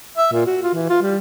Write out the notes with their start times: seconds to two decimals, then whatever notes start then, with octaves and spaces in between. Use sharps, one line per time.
0.18 E5
0.33 A#2
0.46 F#4
0.63 F4
0.74 E3
0.89 F4
1.02 G3